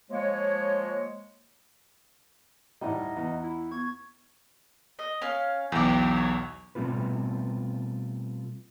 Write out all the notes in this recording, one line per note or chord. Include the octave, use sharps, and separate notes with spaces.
F3 G#3 A#3 C#5
D#2 A2 G3 D#5 E5 F#5 A#5
E2
E4
B3 C#6 G#6
D#5
C#4 F5
B1 E2 G5 D6
C#5
B2 G3 A3 C4 F4 B4